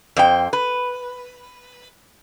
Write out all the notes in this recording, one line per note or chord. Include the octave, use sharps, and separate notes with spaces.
F2 C5 G5
B4